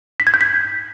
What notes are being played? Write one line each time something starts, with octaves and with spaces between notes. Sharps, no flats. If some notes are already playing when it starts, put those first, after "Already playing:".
B6
G#6
G6
B6